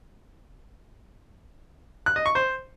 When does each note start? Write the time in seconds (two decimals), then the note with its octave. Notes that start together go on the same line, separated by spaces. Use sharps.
2.06 F#6
2.16 D#5
2.26 C#6
2.35 C5